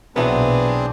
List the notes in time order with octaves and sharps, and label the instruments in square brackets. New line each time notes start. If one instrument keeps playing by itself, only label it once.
[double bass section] B1 A#2 [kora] E3 F#3 [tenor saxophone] B3 [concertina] C4 D4 G#4